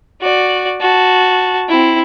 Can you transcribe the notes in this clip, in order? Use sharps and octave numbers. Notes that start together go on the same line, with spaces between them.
F#4 D5
F#4 A5
C4 E4